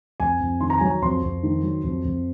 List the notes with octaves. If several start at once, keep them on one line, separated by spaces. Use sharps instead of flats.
F2 G#5
F2
D#3 C6
A#5
F#3 G#5
A#5
F2 C6
F2
D#3
F#3
F2
F2